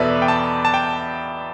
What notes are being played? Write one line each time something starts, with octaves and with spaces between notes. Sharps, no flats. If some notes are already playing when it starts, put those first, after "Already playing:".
Already playing: E2 B2 B3 A4 B4 D5 E5
G5
A5
A5
G5